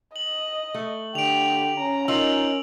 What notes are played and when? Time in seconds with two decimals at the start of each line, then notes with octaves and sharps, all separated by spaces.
0.16 D#5 F#7
0.75 A3
1.15 D3 G4 D7 F7
1.78 C#4 A#5
2.08 D#4 F4 A#4 E6 F7 F#7